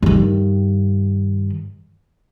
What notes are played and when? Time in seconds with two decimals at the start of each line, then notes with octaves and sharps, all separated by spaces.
0.02 G2 D#3